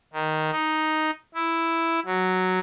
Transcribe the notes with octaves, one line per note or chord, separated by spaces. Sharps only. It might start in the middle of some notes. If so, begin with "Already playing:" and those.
D#3
D#4
E4
F#3